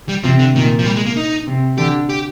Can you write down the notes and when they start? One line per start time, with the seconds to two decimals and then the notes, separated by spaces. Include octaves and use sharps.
0.09 G3
0.24 C3 F3
0.39 D3
0.55 A#2 D#3
0.79 F3
0.86 G3
0.96 G#3
1.06 A#3
1.17 D#4
1.47 C3
1.78 D3 G4
2.09 G4